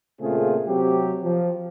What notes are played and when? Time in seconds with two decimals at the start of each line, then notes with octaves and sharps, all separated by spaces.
0.21 A#2 C#3 A3 C4 F4 G#4
0.68 C3 F#3 C4 G4
1.24 F3